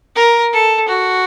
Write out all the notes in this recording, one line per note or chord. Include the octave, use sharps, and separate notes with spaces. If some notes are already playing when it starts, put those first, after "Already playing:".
A#4
A4
F#4